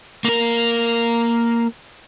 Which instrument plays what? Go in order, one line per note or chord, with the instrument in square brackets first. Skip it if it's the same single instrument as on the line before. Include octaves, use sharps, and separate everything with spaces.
[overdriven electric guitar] A#3 A#4